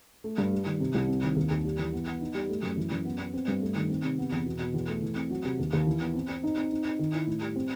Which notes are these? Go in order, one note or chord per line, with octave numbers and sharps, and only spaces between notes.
A3
G2
G3
D#3
C3
C2
C4
D#3
D#2
D#2
G3
E3
B3
B3
D#4
G3
A3
F#2
E3
F#2
B3
B3
C4
G2
A3
D#3
C4
C3
B3
E2
B2
B2
E2
A3
E3
C4
F#3
C3
D#2
D#2
E3
B3
C4
C4
D#4
C4
D#4
D#4
D#3
E4
A2
G3
C4